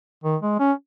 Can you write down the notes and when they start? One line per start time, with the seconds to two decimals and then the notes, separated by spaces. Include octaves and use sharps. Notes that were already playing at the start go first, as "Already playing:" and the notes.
0.24 D#3
0.42 G#3
0.60 C#4